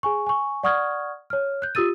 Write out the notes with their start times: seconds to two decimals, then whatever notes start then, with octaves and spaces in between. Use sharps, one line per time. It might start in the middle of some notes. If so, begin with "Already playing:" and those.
0.03 G#4 G#5 C#6
0.27 G#5 C#6
0.63 D5 F#5 C#6 D#6 F6 G#6
1.30 C#5 F6
1.62 F#6 G6
1.75 F4 G4 D#6 E6 A6 D#7